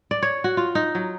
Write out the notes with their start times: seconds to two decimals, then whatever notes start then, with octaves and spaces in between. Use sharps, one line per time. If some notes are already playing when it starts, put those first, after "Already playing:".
0.11 D5
0.22 C#5
0.44 F#4
0.57 F4
0.75 D#4
0.95 F#3